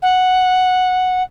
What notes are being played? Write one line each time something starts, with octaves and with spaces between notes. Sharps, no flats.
F#5